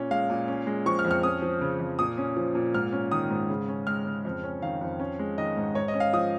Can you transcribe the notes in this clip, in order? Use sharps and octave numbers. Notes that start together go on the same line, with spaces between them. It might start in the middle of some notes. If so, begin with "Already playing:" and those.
Already playing: A#2 C#4
G#3 F5
A#2
C#4
G#3
F3 C#6
F6
F2
F6
C#4 D#6
F3
C#3
F2
A#2 D#6
C#4
F3
A#2
G#2 F6
C#4
D#3 D#6
G#2
C#3
C#4
G#3 F6
C#3
F2
C#4
D#3 F5
F2
C#4
G#3
D#3 D#5
G#2
G#2 C#5
D#5
C#4
F5
F3 D#6